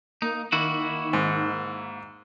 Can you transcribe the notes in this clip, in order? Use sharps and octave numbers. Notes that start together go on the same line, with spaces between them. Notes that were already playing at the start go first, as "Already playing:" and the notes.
A#3 D#4
D#3 A#3 E4 F#4
G#2